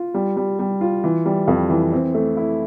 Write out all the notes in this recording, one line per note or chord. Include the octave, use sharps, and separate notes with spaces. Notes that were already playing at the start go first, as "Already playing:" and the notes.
Already playing: F4
G3
G3
G3
F4
E3
G3
F2
E3
C4
A3
E4